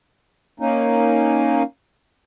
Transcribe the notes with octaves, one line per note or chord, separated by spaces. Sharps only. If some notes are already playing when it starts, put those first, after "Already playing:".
A#3 C#4 D#4